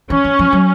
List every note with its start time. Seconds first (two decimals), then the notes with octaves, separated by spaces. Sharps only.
0.10 E3 C#4
0.24 E3
0.39 F3
0.52 F#3